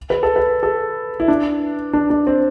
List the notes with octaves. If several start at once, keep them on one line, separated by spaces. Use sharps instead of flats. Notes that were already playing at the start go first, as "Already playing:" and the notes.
B4
A4
B4
A4
E4
D4
D4
D4
C4